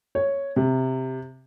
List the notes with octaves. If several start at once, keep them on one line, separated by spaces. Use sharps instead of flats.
C#5
C3